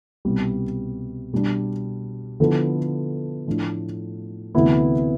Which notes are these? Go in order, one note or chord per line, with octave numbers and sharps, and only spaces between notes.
C2 B2 G3 B3
B2 G3 D4
D3 F3 B3 E4 A4
A2 F3 A3 D4 F4
D2 C3 E3 B3 E4